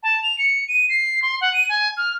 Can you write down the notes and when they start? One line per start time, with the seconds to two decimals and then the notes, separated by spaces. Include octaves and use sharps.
0.03 A5
0.23 F7
0.39 C#7
0.68 D#7
0.89 C7
1.22 C6
1.41 F#5
1.54 D#7
1.69 G#5
1.97 F6